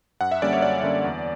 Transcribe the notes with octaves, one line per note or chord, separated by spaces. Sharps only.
F#2 F#5
E5
D3 G3 A#3 C#4 D5
C#5
F#2 D5
D3 G3 A#3 C#4
E2